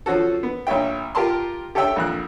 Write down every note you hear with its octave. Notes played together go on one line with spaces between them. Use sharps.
F3 C#4 F#4 A4
B3
A#1 C#5 E5 G5
F4 G4 A#4 A5 C6
G4 A4 C#5 E5 G5 E6
A#1 F2 F#6